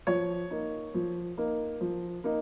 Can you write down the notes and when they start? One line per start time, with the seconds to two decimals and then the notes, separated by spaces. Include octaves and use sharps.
0.07 F3 C#5
0.51 A#3 D#4
0.94 F3
1.37 A#3 D#4
1.81 F3
2.24 A#3 D#4